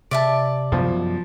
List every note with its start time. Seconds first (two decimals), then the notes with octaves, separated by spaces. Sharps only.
0.11 C3 D5 E5 A5
0.72 F#2 F3 B3